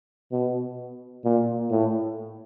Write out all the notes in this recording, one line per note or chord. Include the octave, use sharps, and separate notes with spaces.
B2
A#2
A2